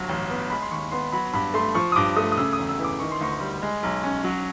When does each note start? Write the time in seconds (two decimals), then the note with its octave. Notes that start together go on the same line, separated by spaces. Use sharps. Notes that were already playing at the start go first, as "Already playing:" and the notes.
Already playing: G1 F#3
0.09 A1
0.30 B3
0.50 G#3 B5
0.62 C6
0.71 D#2 C#6
0.91 B3 C6
1.12 F#3 B5
1.33 G2 B5
1.54 A3 C6
1.75 F3 C#6
1.92 D#6
1.96 G2 D6
2.16 A3 D#6
2.32 D#6
2.37 C#3 E6
2.53 D#6
2.58 E1
2.69 E6
2.79 E3
2.84 D6
2.99 D#3 C#6
3.11 C6
3.21 D2 C#6
3.41 G3
3.62 G#3
3.83 B1
4.04 C#4
4.24 F#3